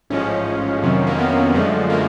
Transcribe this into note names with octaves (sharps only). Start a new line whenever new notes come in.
A1 G#2 F3 G#3 C#4
F2 C3 D#3 F#3
A#3
B3
F#2 D3 F3 G#3 A3
A#3